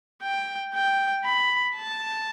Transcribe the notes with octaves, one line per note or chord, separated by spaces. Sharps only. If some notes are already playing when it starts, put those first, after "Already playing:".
G5
G5
B5
A5